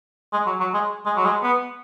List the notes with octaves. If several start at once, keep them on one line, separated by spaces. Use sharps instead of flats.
G#3
F#3
F#3
G#3
G#3
F#3
G#3
B3